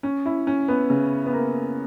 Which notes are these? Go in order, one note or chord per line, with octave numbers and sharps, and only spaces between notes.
C#4
E4
C#4
B3
C#3
B3
A#3